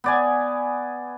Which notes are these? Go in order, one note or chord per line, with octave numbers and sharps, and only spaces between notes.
B3 D5 G#5